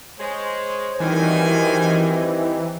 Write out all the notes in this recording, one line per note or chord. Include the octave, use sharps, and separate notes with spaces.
G#3 C5 C#5
F#2 D#3 E3 G3 C4 D#4 G#5